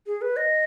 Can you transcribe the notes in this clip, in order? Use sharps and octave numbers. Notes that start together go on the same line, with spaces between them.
G#4
B4
D#5